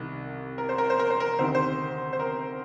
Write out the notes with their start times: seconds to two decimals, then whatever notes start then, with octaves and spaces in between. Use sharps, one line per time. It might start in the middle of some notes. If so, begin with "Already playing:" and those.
Already playing: C2 C3 D#3
0.58 A#4
0.69 C5
0.78 A#4
0.90 C5
1.00 A#4
1.10 C5
1.20 A#4
1.38 D2 C3 D#3 C5
1.55 C5
2.13 C5
2.20 A#4